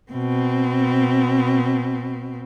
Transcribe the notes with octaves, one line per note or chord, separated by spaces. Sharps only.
B2 C4